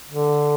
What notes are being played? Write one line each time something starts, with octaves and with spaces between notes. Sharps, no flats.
D3